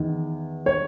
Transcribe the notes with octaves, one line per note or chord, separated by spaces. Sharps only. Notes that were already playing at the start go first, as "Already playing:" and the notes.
Already playing: E2 D#3
C#5